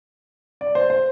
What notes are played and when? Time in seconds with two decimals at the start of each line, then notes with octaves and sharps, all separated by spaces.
0.61 D5
0.75 C5
0.90 C5